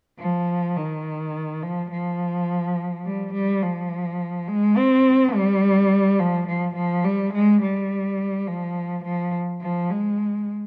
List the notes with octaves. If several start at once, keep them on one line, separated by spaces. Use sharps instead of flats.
F3
D#3
F3
F3
G3
G3
F3
G#3
C4
G3
F3
F3
F3
G3
G#3
G3
F3
F3
F3
G#3